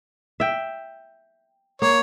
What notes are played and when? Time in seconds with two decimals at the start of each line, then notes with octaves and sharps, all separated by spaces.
0.40 E5 G5
1.82 A#3 C#5